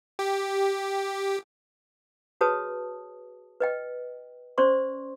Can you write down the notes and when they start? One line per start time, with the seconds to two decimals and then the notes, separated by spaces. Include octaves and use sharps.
0.19 G4
2.41 F#4 G#4 B4 C#5 A5 D#6
3.60 B4 D#5 G5
4.58 C#4 C5 D5 C6 C#6